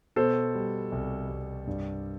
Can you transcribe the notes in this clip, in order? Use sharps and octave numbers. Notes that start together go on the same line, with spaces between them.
B2 A4 C5
G3
C2
C2
G2